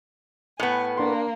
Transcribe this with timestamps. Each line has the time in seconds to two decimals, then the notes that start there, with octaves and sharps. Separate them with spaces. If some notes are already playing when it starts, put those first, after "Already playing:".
0.60 A2 B3 G#5
0.97 A#3 D4 C6